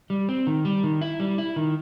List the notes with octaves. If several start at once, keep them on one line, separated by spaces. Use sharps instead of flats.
G3
C4
D#3
G3
D#3
E4
G3
E4
D#3